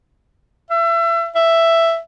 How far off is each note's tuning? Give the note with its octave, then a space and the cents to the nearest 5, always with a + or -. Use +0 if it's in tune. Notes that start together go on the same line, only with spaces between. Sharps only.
E5 +30
E5 +5